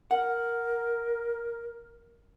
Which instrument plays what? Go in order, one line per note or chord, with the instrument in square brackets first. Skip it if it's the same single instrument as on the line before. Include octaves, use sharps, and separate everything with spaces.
[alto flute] A#4 [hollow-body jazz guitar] F#5